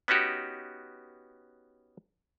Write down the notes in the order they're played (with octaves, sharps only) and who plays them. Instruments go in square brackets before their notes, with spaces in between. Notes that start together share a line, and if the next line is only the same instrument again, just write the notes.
[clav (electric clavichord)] B3 C#4 D#4 F#4 G4